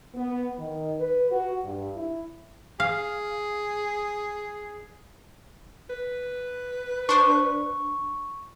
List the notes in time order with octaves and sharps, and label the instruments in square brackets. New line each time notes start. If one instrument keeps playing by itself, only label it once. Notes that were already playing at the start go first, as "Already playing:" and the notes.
[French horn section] B3
D#3
B4
F#4
G2
E4
[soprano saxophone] G#4 [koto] F5
[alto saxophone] B4
[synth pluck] D4 C5 [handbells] C#6